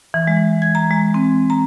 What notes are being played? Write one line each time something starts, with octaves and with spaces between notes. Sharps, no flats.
E3
G#3
G#6
A#5
G#3
C4
A#5